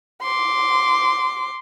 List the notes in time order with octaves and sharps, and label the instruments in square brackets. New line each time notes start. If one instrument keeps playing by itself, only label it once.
[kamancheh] C6 D6